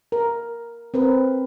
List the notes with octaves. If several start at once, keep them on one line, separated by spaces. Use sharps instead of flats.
A#4
C4 A#4 B4